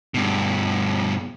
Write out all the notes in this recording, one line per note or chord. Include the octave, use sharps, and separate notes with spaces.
G2 B2